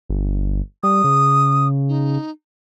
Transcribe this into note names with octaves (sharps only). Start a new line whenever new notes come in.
G1
G3 D#6
C#3
D#4